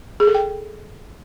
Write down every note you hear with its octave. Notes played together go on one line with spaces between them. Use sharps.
G#4
A4
G5